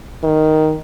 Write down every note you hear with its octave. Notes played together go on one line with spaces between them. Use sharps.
D#3